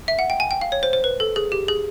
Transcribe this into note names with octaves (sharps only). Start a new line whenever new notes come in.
E5
F#5
G5
G#5
G5
F5
C#5
C5
C5
B4
A4
G#4
G4
G#4